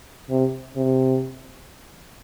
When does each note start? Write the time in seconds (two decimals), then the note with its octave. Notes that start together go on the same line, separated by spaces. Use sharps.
0.30 C3
0.76 C3